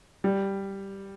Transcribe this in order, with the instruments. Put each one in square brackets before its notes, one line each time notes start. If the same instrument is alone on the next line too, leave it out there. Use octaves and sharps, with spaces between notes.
[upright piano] G3